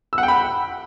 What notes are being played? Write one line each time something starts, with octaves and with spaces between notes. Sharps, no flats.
E6
F#5
G5
B5